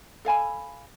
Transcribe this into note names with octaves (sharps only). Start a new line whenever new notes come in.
A4 F5 G#5 B5